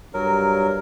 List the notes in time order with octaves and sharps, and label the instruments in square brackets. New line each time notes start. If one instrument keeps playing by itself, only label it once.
[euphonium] G2 [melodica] F#3 A#4